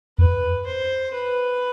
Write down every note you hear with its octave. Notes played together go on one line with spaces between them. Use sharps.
F2 B4
C5
B4